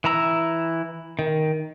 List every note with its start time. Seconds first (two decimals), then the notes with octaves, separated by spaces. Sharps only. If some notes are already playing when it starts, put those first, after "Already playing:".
0.04 E3 E4 A#5 E6
1.19 D#3